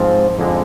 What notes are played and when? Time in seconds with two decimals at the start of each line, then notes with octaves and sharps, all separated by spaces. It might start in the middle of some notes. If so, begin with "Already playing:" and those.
Already playing: G#2 F3 C4
0.39 F2 D3 G#3